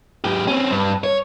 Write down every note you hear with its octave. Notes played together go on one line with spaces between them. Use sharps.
G#2 G4
C4 C#4
G2
C#5